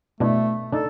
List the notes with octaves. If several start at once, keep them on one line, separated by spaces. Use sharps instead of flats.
B2 A3 D4 E4
D4 D#4 A4